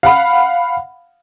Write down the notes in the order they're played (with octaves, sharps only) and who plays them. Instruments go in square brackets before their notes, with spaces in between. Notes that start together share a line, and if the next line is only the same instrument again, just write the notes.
[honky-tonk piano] F5 F#5 B5